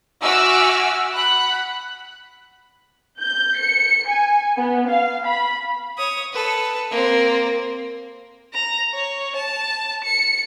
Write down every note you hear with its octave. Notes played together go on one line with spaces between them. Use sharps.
F#4 E5 G#5 D6 E6 F6
F#5 B5 F#6
G6
C#7
G#5
B3
F5
B5
C#5 D#6
A4 B4
A#3 C4
A#5
C#5
A5
C#7